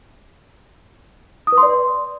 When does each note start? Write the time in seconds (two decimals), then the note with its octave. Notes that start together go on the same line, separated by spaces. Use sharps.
1.47 D#6
1.52 B4
1.58 C6
1.63 D5